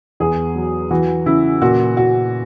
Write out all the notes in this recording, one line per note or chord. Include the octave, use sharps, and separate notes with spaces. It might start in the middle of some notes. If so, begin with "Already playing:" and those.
E2 G#4
F#3
E3 F#4
C#3 E4
A#2 F#4
A#2 F#4